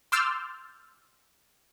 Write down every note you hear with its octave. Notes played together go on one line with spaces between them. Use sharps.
C6 D6 E6 F6 G6 A6